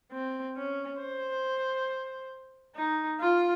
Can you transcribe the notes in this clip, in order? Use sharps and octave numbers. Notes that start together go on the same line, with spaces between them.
C4
C#4
C5
D#4
F4